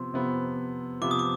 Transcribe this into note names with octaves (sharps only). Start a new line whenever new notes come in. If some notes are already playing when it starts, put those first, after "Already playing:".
Already playing: C3 F3 B3 C6
C3 F3 B3
C3 F3 B3 D6
D#6
D6